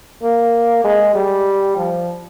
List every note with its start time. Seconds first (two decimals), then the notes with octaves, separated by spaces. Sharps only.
0.22 A#3
0.84 G#3
1.14 G3
1.76 F3